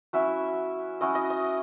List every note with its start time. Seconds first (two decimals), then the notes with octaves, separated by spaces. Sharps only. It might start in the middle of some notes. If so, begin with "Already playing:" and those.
0.13 F#3 C#4 E4 E5
1.01 F#3 C#4 E4 D#5
1.15 D#5
1.30 D#5